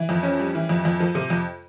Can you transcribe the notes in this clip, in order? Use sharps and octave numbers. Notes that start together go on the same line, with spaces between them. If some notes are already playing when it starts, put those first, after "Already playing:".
Already playing: E3
F2
C#4
G3
E3
F2
F2
F3
C3
F2